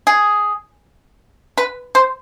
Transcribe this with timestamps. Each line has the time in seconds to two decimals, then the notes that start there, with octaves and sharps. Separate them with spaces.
0.07 G#4
1.58 B4
1.95 C5